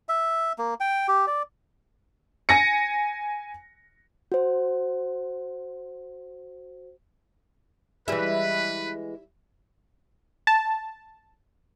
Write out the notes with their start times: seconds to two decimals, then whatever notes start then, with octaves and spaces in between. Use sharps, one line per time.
0.09 E5
0.58 A#3
0.80 G5
1.08 G4
1.27 D5
2.49 G#5 A#6 C#7
4.32 F#4 C5
8.08 E3 G3 G#3 E4 B4
10.47 A5